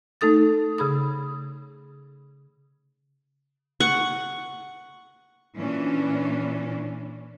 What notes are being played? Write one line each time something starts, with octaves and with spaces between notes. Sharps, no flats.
A3 D#4 A4 D#6 A6
C#3 G#4 B5 D#6
F#5 C#6
A#2 E3 C#4 D4